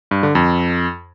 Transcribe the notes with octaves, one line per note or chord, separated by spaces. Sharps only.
G2
D3
F2